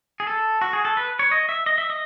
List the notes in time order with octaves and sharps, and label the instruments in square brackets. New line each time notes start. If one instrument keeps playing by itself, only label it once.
[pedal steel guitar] G#4
A4
F#4
G#4
A4
B4
C#5
D#5
E5
D#5
E5
D#5